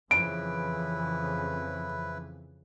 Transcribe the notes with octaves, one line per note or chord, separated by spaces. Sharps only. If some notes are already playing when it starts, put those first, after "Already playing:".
F2 C#3 E3 E4 B4 D7